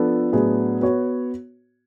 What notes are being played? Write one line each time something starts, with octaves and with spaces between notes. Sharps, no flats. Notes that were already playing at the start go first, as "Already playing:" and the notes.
Already playing: F3 B3 D4 F4 A4
A2 F#3 B3 D4 G#4
B3 F#4 C#5